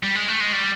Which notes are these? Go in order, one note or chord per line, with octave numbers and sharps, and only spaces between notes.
G3
G#3
A3
G#3
G3